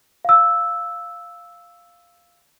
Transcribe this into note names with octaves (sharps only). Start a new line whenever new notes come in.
F5 E6